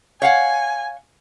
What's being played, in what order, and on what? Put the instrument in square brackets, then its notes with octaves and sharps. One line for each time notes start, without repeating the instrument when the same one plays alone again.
[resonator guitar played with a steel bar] C#5 F5 F#5 [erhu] G#5